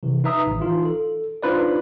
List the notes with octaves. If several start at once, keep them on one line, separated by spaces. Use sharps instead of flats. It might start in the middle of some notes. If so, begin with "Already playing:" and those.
C3 E3
D#4 B4 E5 A#5 D#6
A1
E3 D#4 F4
A4
D4 D#4 F4 B4 C5 D5